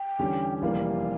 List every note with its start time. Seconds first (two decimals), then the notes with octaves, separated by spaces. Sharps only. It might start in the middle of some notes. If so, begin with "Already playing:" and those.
Already playing: G5
0.19 E2 D3 G3 C#4 G4
0.62 F1 E2 E3 G3 A#3 F5